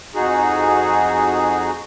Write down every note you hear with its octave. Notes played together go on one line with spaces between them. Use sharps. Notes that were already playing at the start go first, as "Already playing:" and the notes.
F2 D#4 F#4 G#4